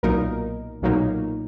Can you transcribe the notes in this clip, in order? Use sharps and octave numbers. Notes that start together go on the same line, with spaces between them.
B1 A#2 F#3 A#3 D#4 A#4
B1 A#2 F#3 A#3 D#4